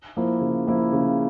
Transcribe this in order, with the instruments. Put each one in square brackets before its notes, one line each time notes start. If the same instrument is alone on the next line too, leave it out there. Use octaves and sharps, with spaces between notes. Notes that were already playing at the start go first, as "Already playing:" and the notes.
[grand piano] F3 A#3 E4
C#3
F3 A#3 E4
C#3